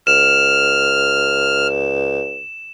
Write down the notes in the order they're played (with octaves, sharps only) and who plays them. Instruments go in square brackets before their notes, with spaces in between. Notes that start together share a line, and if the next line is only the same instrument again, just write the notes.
[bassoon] C#2 [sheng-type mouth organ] F6 [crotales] E7